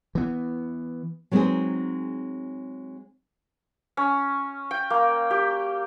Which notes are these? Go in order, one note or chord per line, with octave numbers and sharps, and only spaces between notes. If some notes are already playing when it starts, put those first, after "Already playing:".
E3 B3
F#3 G#3 B3 C4 D#4 G#4
C#4
G5
A#3
G4